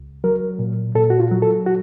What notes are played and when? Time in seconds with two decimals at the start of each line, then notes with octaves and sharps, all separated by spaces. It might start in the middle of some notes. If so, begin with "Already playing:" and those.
Already playing: C#2
0.24 F#3 A#4
0.59 A#2
0.95 A#2 A4
1.10 F#4
1.20 F4
1.31 F#3
1.42 A4
1.66 F#4